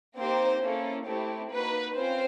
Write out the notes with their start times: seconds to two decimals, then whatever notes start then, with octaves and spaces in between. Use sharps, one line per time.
0.17 A#3 C4 D#4 G4 C5
0.61 A#3 C#4 E4 A4
1.06 A3 C4 E4 G4
1.51 A#3 D#4 F#4 B4
1.95 C4 C#4 F4 C5